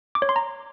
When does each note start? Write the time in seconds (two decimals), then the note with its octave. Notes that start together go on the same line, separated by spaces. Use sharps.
0.15 D6
0.22 C#5
0.29 C6
0.36 A#5